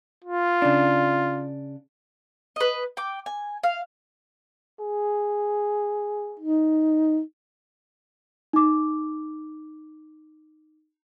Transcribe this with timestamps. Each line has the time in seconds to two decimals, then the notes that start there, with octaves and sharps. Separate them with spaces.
0.24 F4
0.62 C#3 D4
2.56 B4 D#5
2.97 G5 D6
3.26 G#5
3.63 F5
4.80 G#4
6.40 D#4
8.53 D#4 D6